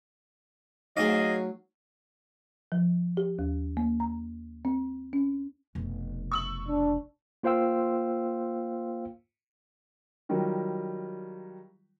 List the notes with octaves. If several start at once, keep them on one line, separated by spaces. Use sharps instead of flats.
F#3 A3 D#4 G#4 D#5 F5
F3
G4
D#2
A#3
A#5
C4
C#4
F1 B2
C#6 E6 F#7
D4
A#3 F4 C5 F5 G5 E6
D#3 F#3 G3 F4 A#4